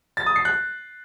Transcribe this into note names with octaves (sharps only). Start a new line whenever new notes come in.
A6
D#6
C7
F#6